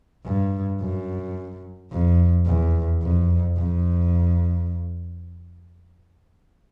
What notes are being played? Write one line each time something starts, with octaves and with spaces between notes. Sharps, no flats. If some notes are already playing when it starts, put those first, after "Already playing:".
G2
F#2
F2
E2
F2
F2